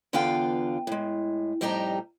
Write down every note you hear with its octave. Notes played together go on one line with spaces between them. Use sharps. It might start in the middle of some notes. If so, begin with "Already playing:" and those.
E2 D3 B3 F4 F5 G5
A2 G#3
F2 A2 G3 D#4 G4 A#5